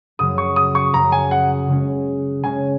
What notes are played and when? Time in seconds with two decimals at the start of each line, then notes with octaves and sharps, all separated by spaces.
0.19 F#2 C#3 F#3 D#6
0.38 C#6
0.56 D#6
0.75 C#6
0.94 F#2 C#3 F#3 A#5
1.12 G#5
1.31 F#5
1.68 C#3 G#3 C#4
2.44 C#3 G#3 C#4 G#5